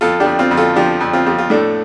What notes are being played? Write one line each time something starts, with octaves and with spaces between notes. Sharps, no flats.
F2 F4 A4
D4 G4
F2
C4 F4
F2
F4 A4
F3 D4 G4
F2
C4 F4
F2 G4
F4
A2 A3 D4